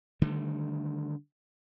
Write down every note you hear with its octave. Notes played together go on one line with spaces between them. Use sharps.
D3 D#3 G3 A3